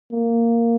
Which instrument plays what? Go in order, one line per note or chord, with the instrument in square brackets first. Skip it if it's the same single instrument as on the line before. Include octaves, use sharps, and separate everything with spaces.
[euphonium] A#3